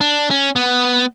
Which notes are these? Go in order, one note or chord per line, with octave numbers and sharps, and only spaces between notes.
D4
C#4
B3